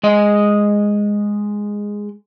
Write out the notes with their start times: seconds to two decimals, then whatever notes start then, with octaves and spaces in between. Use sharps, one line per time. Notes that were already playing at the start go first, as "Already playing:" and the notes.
0.03 G#3 D#5